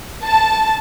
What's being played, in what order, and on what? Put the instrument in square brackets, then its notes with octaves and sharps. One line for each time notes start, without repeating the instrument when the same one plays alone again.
[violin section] A5